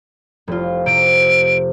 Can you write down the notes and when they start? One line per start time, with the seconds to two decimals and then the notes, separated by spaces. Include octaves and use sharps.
0.48 F1 F4
0.86 C3 D7